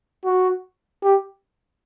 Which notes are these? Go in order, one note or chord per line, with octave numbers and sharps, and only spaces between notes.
F#4
G4